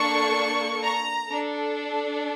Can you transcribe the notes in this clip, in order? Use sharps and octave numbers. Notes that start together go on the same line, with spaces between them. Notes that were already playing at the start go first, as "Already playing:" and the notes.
Already playing: A#3 D4 A4 C#6
A#5
D4 A4